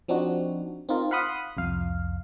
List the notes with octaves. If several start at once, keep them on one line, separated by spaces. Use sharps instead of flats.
F3 C4 D4 D#4 F#4
C4 D#4 F4 A#4
F5 F#5 B5 C6 D#6
C2 F2 F5